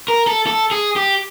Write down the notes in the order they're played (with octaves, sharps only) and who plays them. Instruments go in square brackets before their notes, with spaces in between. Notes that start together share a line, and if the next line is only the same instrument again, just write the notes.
[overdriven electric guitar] A#4
A4
A4
G#4
G4